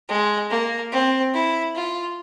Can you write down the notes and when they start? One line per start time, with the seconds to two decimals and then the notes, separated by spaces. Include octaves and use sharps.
0.09 G#3
0.50 A#3
0.92 C4
1.34 E4
1.75 F4